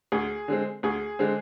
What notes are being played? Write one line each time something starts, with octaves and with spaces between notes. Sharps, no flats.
D2 G#4
D3 G#3 C4
D2 G#4
D3 G#3 C4